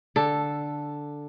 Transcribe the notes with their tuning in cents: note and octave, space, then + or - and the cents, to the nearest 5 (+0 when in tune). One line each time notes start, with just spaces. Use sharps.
D3 +0 A4 +0